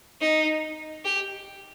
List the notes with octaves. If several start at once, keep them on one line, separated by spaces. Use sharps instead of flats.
D#4
G4